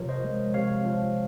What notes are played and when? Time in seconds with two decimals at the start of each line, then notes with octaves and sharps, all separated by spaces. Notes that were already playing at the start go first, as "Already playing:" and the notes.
Already playing: C3 F3 A#4 C#5
0.09 C5 D#5
0.24 G#3
0.54 C3 C#5 F5
0.85 F3